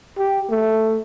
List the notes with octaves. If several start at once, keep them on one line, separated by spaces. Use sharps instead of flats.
G4
A3